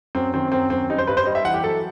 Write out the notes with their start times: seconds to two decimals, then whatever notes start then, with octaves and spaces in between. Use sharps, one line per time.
0.15 F#2 C4
0.34 D#3 C4
0.52 F#2 C4
0.70 F#2 C4
0.90 G3 D#4
0.98 C5
1.07 G2 B4
1.17 C5
1.26 G3 D#5
1.35 E5
1.44 E3 F#5
1.54 G4
1.63 F#3 A4